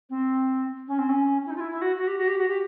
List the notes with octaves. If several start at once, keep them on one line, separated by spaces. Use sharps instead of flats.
C4
C#4
C4
C#4
E4
D#4
F4
E4
E4
F#4
F#4
G4
F#4
G4
F#4
G4